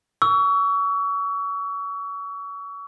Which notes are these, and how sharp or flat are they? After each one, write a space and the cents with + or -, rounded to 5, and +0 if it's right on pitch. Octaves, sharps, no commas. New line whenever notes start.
C#6 +35 E6 +0